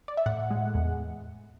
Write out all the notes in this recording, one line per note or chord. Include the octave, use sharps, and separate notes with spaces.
D5
E5
A2 F#5
G#3
E2